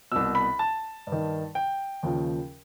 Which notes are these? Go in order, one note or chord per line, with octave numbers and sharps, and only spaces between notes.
C2 B2 E6
B5
A5
G2
D#3
G5
D#2 C#3 F3